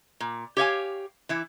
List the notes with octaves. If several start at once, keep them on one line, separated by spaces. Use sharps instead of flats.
A#2
G4 C#5 F5 G#5
E3 E4